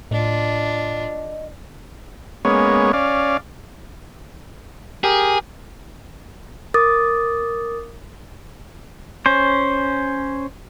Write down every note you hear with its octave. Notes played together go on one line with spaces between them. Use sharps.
A2 D4 F4 D#5
G#3 A#3 B3 C#4 C#5
C#4 D5 F5
G4 G#4 A#4
A#4 D6 D#6 A6
C#4 C5